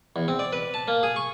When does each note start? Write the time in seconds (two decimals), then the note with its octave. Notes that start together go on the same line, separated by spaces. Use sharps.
0.16 E2
0.28 C4
0.39 D5
0.53 B4
0.74 A5
0.88 A#3
1.03 G#4
1.16 C#6